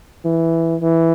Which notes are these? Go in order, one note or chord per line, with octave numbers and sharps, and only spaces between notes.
E3
E3